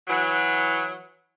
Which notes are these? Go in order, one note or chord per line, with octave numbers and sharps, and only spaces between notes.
E3 F#3